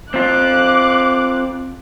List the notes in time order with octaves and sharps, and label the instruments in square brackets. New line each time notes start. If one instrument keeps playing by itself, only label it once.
[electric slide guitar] C4 F4 [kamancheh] D6 F#6